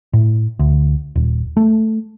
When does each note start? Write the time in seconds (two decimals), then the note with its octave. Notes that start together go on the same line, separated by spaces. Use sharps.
0.13 A2
0.59 D2
1.16 D#1
1.57 A3